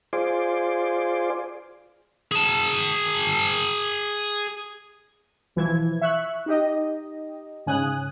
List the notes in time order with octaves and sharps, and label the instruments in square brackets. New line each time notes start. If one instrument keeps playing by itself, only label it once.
[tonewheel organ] F4 G#4 C5 D5
[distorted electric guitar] G#4 A5
[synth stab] B1 E3 F3 E4 G#6
E5 C#6 F#6
D#4 G4 D#5
G#2 C#3 G#5 D#6 F#6